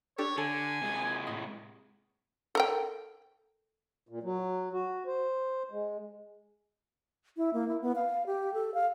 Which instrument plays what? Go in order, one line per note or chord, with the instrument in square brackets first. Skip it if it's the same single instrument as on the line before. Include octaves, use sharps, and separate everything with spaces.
[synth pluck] D4 G4 A4 [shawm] C#5
[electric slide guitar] D3 [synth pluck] A4 [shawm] G#5
[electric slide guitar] C3 G#3
[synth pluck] A2 D#5
[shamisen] A4 A#4 G5
[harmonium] A#2
F#3
F#4
C5
G#3
[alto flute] E4
A#3
E4
B3
F5
G4
A4
F5